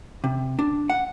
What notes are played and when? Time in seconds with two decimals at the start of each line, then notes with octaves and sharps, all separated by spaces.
0.24 C3
0.59 D4
0.90 F#5